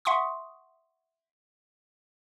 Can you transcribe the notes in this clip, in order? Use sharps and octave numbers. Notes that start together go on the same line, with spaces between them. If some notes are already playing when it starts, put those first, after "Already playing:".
E5 F#5 C6 C#6 D#6